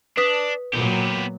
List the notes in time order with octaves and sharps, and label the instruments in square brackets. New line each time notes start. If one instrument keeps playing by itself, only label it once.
[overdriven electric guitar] D4 [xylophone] B4 D#6 B6
[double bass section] A#2 F#3 [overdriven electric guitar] B3 G4